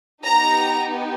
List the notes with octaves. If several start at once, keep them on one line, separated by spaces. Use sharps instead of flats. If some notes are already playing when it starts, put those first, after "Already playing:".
B3 D#4 G4 A#5